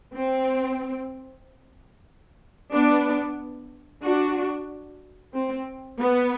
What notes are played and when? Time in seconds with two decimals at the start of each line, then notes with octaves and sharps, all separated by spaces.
0.14 C4
2.74 B3 D4
4.04 D4 F#4
5.33 C4
5.99 B3